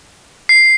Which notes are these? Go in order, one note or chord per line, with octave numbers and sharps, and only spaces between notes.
C7